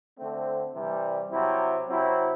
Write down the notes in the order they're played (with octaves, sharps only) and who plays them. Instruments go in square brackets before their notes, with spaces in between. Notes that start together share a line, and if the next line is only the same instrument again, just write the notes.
[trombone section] D3 A3 C4
C3 E3 G3
C3 F#3 C4 E4
C3 F#3 C4 E4